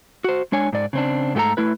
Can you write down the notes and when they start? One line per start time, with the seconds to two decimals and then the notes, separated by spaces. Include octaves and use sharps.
0.24 F#4 C5
0.52 G#3 D4 C#5 G#5
0.73 G#2 D5
0.93 C#3 C4 D4
1.35 G#2 A3 G4 A4 A#5
1.57 A3 E4 B4